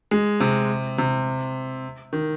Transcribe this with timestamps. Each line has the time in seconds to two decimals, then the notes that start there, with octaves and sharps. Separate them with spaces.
0.11 G#3
0.40 C3
0.98 C3
2.13 D#3